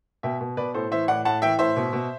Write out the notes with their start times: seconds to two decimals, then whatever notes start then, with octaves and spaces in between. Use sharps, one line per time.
0.23 B2 E5 G5
0.41 B2
0.57 B2 B4 D5
0.74 A2 A4 C5
0.91 E3 C5 E5
1.08 A2 D5 F#5
1.25 A2 F#5 A5
1.42 E3 E5 G5
1.59 A2 C5 E5
1.77 B2
1.93 B2